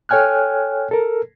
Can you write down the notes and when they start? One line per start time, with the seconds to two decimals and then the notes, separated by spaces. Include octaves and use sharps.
0.09 A4 C#5 G5 G#5 F6 F#6
0.91 A4 A#4